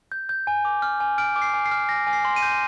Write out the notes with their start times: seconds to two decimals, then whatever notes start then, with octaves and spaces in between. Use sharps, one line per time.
0.12 G6
0.29 G6
0.47 G#5
0.65 D6
0.82 F6
1.00 G#5
1.18 F6 D7
1.36 D6
1.42 C7
1.54 G#5
1.66 C7
1.71 F6
1.89 G#5 A#6
2.07 G#5
2.13 C7
2.25 C6
2.36 D#7
2.43 G6